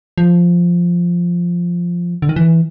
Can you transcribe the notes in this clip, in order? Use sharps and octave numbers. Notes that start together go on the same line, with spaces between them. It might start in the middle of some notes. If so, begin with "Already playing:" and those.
F3
D3
D#3
E3